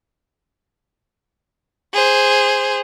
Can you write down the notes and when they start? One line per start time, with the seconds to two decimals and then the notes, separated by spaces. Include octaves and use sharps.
1.93 G#4 C5